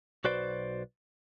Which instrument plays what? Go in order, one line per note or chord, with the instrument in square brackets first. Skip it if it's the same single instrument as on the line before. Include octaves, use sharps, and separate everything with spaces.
[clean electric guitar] B1 F#4 B4 C5 D5